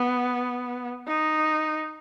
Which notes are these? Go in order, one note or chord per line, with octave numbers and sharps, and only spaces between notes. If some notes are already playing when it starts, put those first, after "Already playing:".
Already playing: B3
D#4